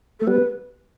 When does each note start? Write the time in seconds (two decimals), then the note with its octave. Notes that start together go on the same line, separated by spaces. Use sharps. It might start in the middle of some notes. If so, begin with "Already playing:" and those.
0.20 A3 A4
0.27 G3 B3 B4